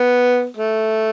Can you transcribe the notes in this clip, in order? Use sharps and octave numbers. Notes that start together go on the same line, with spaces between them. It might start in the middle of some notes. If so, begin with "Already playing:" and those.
Already playing: B3
A3